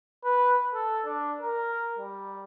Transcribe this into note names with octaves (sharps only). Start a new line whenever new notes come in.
B4
A4
D4
A#4
G3